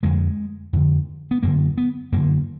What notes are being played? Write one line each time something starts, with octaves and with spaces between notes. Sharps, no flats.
F2 D3 G#3
F2 D3
B3
F#2 D3 A#3
B3
F#2 D3 A#3